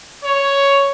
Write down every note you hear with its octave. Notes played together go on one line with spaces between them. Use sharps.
C#5